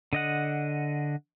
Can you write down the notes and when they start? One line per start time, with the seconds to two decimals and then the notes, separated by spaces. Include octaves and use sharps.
0.13 D3 D#5 F#5